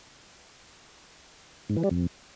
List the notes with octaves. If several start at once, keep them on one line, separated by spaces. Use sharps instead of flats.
G#2
E3
G3
F2